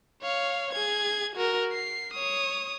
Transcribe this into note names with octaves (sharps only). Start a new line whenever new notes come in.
C#5 F5
G#4 G#6
F#4 A#4
C7
C#5 D#6